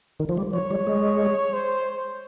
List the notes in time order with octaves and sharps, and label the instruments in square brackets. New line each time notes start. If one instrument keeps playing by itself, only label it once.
[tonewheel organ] D#3
F3
G3
[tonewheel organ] F3 [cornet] C#5
[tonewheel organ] G3
G#3
[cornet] C5